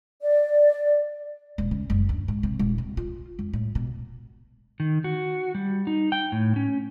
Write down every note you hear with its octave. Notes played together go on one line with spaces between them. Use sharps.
D5
D#1
C#3
F#1
D2
G#2
C3
D#1
C3
F4
F2
A2
B2
D#3
F#4
G3
D#4
G5
A2
C#4